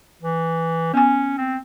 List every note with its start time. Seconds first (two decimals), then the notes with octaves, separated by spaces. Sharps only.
0.22 E3
0.94 B3 C#4 G#5
1.38 C4